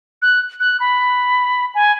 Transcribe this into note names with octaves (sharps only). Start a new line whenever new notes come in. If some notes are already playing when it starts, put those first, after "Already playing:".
F#6
F#6
B5
G#5